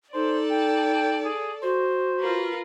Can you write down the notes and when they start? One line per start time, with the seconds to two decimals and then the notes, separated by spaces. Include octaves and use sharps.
0.14 D#4 A4 C5 D5
0.51 G5
1.25 G#4
1.63 F#4 C5
2.19 F4 A#4 B4